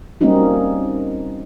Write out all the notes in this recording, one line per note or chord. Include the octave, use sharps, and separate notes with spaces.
G3 A#3 C4 C#4 D#4 F#4